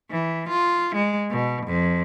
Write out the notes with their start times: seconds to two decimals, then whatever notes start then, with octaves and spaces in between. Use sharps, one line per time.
0.11 E3
0.49 F4
0.95 G#3
1.30 B2
1.66 F2